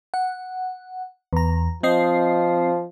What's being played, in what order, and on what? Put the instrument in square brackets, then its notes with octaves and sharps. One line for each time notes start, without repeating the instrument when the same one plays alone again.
[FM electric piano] F#5
E2 A#5
[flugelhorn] F3 [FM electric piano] C4 D#5 C7